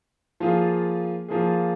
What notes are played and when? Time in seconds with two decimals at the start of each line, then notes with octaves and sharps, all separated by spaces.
0.40 F3 A#3 F4 G#4
1.28 F3 A#3 F4 G#4